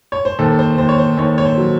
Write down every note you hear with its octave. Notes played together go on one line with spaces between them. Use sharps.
C#5
C5
D#2 A4
C5
D#2 C5
C#5
C5
D#2 C#5
C#5
C5
F#3